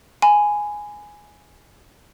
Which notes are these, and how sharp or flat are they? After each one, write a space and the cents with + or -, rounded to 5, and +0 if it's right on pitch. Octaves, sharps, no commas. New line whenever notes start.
G#5 +0 B5 +25